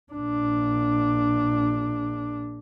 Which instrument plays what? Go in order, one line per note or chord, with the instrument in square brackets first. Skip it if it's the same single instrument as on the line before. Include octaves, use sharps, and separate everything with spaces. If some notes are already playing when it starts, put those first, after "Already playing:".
[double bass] A#1 D4